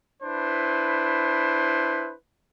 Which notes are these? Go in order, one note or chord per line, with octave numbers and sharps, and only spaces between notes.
D4 E4 B4 C5